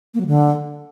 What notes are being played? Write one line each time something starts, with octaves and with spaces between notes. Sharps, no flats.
A#3
F#3
D3